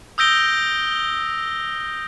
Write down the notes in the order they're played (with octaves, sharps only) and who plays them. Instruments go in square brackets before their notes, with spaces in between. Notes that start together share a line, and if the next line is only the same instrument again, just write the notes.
[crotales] D#6 E6 G6 A#6 D7 G7